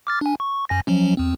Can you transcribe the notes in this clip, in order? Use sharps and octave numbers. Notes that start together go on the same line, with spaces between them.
D6 F6 A6
D4 G#5
C#6
F#2 G#5 A#6
F3 F#3 C#4
E2 C4